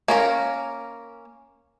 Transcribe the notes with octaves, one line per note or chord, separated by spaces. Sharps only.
A#3 C#4 A#4